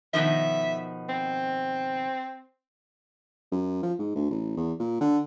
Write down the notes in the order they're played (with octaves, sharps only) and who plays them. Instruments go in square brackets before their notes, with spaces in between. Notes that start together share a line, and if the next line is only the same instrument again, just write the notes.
[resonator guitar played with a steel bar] B2 D#3 F3 [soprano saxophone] E5
[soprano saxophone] C4
[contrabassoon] F#2
F3
G#2
D2
A1
E2
A#2
D3